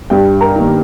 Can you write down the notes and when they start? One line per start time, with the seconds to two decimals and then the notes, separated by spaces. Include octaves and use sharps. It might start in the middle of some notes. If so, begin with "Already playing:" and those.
0.10 G2 G4 G5
0.41 A#4 A#5
0.56 D#3 A#3